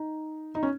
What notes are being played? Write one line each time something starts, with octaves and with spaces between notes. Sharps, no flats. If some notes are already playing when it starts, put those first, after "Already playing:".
Already playing: D#4
D#4
C#4